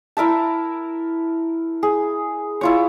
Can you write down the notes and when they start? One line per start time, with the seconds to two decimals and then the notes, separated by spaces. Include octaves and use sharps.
0.17 E4 A#4 E5 A5
1.83 G#4
2.61 E4 F4 C#5